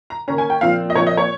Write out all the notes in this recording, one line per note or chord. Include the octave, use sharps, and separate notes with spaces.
A#5
D#3 A#3 C#4 A#5
G#5
G5
A#2 F3 C4 F5
D#5
A#2 F3 C4 C#5
D#5
C#5